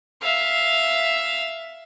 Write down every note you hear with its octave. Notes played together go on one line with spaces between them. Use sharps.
E5 F5